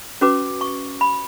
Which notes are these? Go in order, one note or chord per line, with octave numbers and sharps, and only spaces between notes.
C#4 F#4 B4 D6
C#6
B5